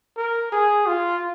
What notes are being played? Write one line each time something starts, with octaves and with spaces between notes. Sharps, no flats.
A#4
G#4
F4